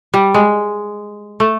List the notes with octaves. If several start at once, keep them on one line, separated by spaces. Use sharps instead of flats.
G3
G#3
A3